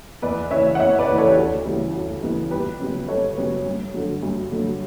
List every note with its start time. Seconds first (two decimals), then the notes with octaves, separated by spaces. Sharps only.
0.22 E2 B4 D5
0.51 C#3 E3 C#5 E5
0.75 F#5
0.80 E2 C#5 E5
0.99 B4 D5
1.09 C#3 E3 B4
1.18 A4 C#5
1.28 G4
1.37 D2 A4
1.66 C#3 E3 G3 B3
1.94 D2
2.23 C#3 E3 G3 B3
2.51 G1 G4 B4
2.79 F#2 C#3 G3 B3
3.08 G1 A4 C#5
3.37 F#2 C#3 G3 B3
3.66 G2
3.94 D3 F#3
4.23 G2
4.52 D3 F#3